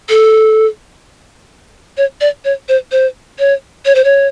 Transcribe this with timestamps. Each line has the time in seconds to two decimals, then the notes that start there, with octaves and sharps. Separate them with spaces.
0.09 A4
1.97 C#5
2.21 D5
2.45 C#5
2.69 C5
2.92 C5
3.39 C#5
3.86 C#5
3.95 C5
4.04 C#5